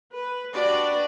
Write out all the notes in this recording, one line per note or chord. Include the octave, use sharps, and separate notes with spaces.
B4
D4 F#4 G4 B4 D5